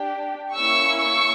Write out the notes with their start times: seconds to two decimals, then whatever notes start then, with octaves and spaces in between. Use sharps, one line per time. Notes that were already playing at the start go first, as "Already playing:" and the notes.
Already playing: D4 G4
0.55 A#3 C#4 E4 C#6 E6
1.01 C#6 E6